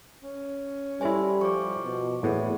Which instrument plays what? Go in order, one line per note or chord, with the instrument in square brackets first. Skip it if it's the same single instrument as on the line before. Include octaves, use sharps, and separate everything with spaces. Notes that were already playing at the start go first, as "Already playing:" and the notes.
[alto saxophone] C#4
[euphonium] G3 [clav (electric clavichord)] E4 C#5 [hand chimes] A4 C5 G#5
[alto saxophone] F3 [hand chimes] C#6 D6
[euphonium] B2
[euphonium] E2 [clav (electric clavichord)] A2 B3 [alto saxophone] G#4